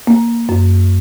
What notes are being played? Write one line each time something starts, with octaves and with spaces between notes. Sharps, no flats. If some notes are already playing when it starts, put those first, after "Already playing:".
A#3
F#2